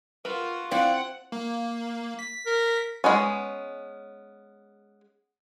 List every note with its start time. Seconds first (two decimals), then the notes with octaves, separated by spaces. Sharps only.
0.25 F4 F#4 A#4 B4
0.71 C4 E4 D5 F5 F#5
1.32 A#3
2.19 B6
2.46 A#4
3.04 G#3 B3 C#4